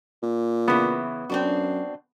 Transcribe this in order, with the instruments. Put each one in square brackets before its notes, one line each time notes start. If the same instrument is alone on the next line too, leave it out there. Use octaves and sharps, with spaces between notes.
[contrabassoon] A#2
[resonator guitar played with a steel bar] C#3 E3 [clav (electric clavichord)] B3
[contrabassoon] F#2 [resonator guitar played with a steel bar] C4 D4 F#4